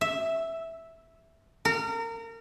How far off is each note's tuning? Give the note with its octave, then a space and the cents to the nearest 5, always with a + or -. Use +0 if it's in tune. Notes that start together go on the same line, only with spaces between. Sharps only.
E5 -5
A#4 -30